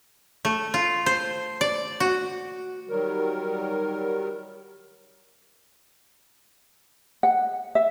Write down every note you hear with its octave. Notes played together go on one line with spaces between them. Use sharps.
A3
F4
C5
D5
F#4
D#3 F#3 G3 A#4
F#5
E5